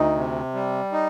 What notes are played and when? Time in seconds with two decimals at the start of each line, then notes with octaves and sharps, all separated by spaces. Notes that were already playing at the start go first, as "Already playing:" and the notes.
Already playing: D2 D#4
0.15 C3
0.54 G3
0.92 D#4